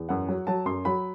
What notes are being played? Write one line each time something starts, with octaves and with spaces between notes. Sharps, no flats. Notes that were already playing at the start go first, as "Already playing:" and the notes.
Already playing: E2
F#2 F#5
F#3
F#3 A5
F#2 C6
F#3 B5